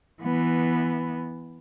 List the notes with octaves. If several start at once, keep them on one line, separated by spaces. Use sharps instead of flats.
E3 B3